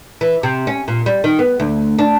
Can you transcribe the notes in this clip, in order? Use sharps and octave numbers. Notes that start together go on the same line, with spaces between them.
E3
C3
C#4
A#2
G3
D#3
B3
D2
D4